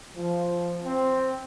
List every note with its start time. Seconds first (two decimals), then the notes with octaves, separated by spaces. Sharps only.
0.16 F3
0.84 C4